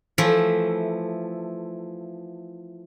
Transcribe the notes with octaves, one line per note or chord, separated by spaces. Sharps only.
E3 F3 A3